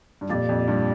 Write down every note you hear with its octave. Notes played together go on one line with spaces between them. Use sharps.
G2
F2 A#2 A#3 G4 D5
F2
G2